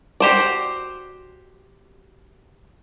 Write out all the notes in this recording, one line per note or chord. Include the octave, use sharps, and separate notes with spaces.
F#4 G4 C5 D5